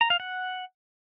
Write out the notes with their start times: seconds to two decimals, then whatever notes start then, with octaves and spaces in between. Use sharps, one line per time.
0.01 A#5
0.10 F5
0.20 F#5